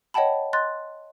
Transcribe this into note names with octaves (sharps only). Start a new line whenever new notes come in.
C#5 D#5 F#5 G5 A5 B5
D#5 C6 F#6 A6